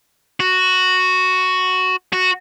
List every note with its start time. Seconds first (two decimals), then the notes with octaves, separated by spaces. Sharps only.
0.40 F#4
2.13 F#4